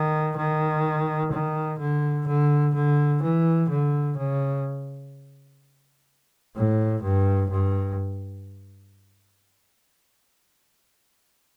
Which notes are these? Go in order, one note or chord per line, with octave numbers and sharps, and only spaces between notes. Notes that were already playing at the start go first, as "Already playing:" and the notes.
Already playing: D#3
D#3
D#3
D3
D3
D3
E3
D3
C#3
A2
G2
G2